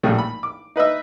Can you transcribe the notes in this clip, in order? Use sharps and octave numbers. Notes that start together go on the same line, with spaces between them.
A#1 A2 C#3 G3 A3
B5
D6
D#4 B4 D#5 E5